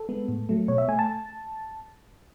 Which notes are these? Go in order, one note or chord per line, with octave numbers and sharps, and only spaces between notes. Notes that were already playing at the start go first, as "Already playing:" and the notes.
Already playing: A4
G#3 B3
A2
F#3 A3
B2 C#5
E5
A3 G#5
A5